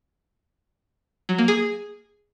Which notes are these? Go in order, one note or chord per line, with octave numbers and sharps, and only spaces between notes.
F#3
A#3
G#4